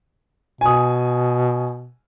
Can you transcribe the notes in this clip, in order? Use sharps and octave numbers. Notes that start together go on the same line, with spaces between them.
B2 G#5 D#6